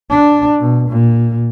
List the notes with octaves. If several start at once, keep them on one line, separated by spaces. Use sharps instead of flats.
D4
B2
A#2